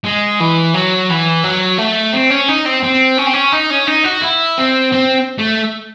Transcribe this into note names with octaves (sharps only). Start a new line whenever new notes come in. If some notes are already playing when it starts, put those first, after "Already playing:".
G#3
E3
F#3
E3
F#3
A3
C4
C#4
D#4
C4
C4
C#4
C4
C#4
D#4
C#4
D#4
F#4
E4
C4
C4
A3